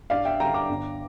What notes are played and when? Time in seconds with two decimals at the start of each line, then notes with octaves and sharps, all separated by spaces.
0.10 G2 D5 F5
0.25 E5 G5
0.40 D3 G3 G5 A#5
0.54 A#5 D6
0.69 G1